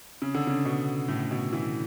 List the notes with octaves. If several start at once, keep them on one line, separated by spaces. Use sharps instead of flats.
C#3
D3
C#3
B2
A2
B2
E3